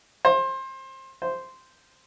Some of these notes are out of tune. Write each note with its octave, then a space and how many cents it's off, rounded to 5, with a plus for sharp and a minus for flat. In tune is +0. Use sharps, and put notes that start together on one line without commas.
C5 +25
C5 -5